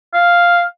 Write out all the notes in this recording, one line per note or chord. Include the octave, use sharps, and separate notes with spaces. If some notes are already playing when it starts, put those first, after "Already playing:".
F5